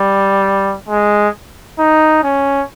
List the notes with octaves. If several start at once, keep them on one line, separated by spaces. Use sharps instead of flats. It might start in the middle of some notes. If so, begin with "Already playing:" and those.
Already playing: G3
G#3
D#4
C#4